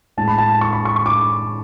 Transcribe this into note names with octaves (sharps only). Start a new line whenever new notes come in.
A2 G#3 A5
B5
A5
C#6
B5
C#6
C#6
D6